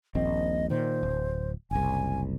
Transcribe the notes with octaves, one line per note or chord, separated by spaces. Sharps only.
D#1 A#1 C4 D#5
A#2 D#3 C5
D1
F#1 C2 G#5